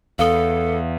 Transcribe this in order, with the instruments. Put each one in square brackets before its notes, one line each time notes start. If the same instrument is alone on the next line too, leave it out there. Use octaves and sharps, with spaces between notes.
[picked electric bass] E2 [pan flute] A4 [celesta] F5 D#6